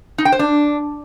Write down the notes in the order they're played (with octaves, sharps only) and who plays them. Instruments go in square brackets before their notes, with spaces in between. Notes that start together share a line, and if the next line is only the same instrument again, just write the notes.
[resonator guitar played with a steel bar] D#4
G5
C5
D4